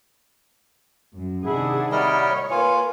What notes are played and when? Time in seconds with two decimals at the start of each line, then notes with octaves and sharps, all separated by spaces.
1.15 F#2
1.46 C3 D#3 D4 E4 G#4 F#5
1.92 G3 E4 A#4 C#5 D#5
2.51 A#3 F4 B4 G#5